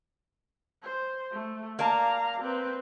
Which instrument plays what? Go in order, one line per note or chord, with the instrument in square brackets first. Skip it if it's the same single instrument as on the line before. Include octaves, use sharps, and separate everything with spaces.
[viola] C5
A3
[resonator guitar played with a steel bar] A#3 D5 A5 [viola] F5 A#5
[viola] C4 B4